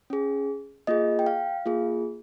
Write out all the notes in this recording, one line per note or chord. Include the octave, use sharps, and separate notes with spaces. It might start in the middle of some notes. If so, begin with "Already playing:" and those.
C#4 G#4
A#3 F4 G#4 D#5
G5
F5
A#3 F4 G#4